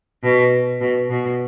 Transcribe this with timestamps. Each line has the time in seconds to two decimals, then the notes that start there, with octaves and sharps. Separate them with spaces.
0.23 B2
0.81 B2
1.10 B2